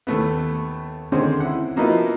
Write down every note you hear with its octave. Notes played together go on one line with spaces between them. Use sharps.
D#2 A3 B3
D3 D#3 G#3 C4 C#4 C5
E4 F#5
F3 A#3 B3 D#4 E4 F#4